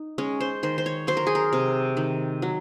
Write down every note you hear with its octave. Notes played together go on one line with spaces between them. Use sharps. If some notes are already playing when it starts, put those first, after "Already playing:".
Already playing: D#4
G#3 C#4
C5
D#3 C5
C5
C#5
F#3 C5
A#4
G#4
A#4
C3
D#3
F#3